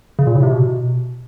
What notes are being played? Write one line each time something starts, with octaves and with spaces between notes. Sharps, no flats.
C#3
A#2
A2
C3
B2